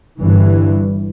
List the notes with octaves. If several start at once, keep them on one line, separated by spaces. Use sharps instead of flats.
G1 G2 E3